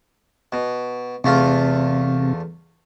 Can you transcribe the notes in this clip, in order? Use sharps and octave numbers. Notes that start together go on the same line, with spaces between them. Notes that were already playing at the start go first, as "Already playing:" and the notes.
B2
E2 C3 A3 F4